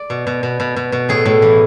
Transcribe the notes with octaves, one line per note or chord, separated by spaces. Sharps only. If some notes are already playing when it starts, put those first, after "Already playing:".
Already playing: D5
B2
B2
B2
B2
B2
B2
A2 G#4
A2
E3